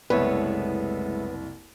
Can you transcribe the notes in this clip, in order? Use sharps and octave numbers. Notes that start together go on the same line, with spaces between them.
F#1 C2 G#3 A3 B3 E4 B4 C#5